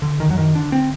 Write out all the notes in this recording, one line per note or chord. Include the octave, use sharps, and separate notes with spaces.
D3
D#3
F#2 F#3
D#3
D3 D4
C4